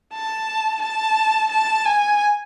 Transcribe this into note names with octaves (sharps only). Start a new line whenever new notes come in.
A5
A5
A5
G#5